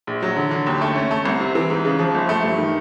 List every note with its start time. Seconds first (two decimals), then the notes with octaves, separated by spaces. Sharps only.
0.07 A#1
0.22 F#3
0.36 D3
0.51 D3
0.66 D#2
0.81 A3
0.95 C#4
1.11 A3
1.25 C2
1.41 C3
1.55 E3
1.70 G#2
1.85 C#3
1.99 F3
2.14 G1
2.29 A3
2.44 G2
2.58 D#3